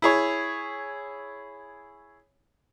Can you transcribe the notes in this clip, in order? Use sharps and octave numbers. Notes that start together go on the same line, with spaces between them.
E4 G#4 C#5